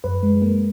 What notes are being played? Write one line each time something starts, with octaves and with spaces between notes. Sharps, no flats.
F#2 B4
G#3
A#3